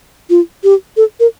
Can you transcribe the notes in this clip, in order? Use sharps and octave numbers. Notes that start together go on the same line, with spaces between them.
F4
G4
A4
A#4